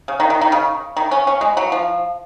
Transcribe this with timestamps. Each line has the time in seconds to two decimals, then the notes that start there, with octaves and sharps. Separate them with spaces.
0.08 C#3
0.20 D#3
0.30 D#3
0.41 D#3
0.52 C#3
0.96 D#3
1.11 C#4
1.27 C#4
1.41 G#3
1.57 F#3
1.72 F3